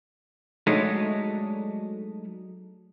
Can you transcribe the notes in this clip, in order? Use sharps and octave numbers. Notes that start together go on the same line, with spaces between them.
F#3 G#3 A3 D4 D#4